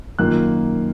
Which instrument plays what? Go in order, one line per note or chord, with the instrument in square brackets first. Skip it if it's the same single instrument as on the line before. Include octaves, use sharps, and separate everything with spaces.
[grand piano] F#2 D#3 A#3 F4 F#6